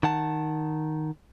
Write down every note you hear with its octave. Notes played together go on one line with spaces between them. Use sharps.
D#3 F#5 A5